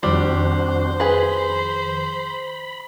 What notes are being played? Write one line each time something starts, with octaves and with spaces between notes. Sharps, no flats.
F2 D#3 F3 G3 C4 D4 F#4 C5
G#4 B4 B5